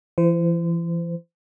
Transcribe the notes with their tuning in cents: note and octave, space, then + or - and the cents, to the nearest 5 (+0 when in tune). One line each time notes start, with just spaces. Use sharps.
E3 +35 C5 -30